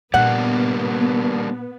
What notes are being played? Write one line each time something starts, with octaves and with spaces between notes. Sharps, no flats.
A#2 G3 A#3 B3 D4 F#5